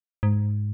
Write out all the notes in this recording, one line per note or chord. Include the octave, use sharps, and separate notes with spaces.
G#2